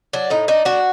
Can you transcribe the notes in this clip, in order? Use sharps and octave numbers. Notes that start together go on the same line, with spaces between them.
F#3 D4
A2 D#4
D4 D#4
D4 F#4